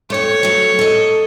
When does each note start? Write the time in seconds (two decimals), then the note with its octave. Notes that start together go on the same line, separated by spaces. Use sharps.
0.10 F2 A3 C#5
0.43 F#3 A3
0.79 A4 D#5